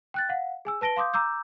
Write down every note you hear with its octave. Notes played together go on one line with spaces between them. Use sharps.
G5 F#6 A6
F5 F#5
G#4 G#5 E6
B4 A5 A#6 D7 G7
F5 C6 D6 D#6 G6
A#5 D6 E6 G6